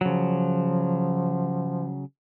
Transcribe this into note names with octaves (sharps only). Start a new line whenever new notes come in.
C#3 F3 F#3